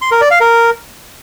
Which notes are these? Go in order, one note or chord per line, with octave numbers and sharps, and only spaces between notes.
C6
A#4
D5
F5
A#4